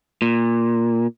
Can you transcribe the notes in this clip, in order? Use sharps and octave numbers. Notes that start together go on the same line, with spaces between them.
A#2